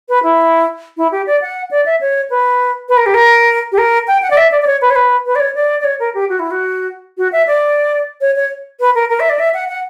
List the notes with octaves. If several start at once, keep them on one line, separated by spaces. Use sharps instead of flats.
B4
E4
E4
G4
D5
F#5
D5
E5
C#5
B4
B4
A#4
G4
A#4
G4
A#4
G5
F#5
D5
E5
D5
D5
C#5
B4
C#5
B4
B4
D5
C#5
D5
D5
C#5
A#4
G4
F#4
E4
F#4
F#4
E5
D5
C#5
C#5
B4
A#4
A#4
E5
D5
E5
F#5
F#5